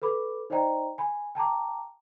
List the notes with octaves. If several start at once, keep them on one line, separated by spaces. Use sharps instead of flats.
A4 B4 B5 D6
D#4 C5 D5 D#5 G5 A#5
G#5 B5
G5 A5 A#5 D6